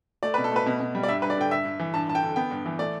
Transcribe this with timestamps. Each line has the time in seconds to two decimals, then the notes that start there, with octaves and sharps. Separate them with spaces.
0.23 A3 D5
0.34 B2 B4
0.44 A4
0.52 A3 B4
0.66 B2
0.80 B2
0.95 G3
1.03 D5
1.08 G2 E5
1.22 G2 B4
1.30 D5
1.37 D3 G5
1.51 G2 E5
1.65 G2
1.80 E3
1.94 G2 A5
2.08 G2 A5
2.15 G5
2.23 D3
2.36 B3 G5
2.51 G2
2.66 E3
2.79 A3 D5